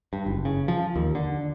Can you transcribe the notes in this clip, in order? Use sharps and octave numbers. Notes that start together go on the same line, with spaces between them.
G2
F#1
C#3
F3
D#2
D3